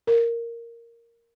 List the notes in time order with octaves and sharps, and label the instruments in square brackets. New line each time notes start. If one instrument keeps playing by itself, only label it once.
[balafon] A#4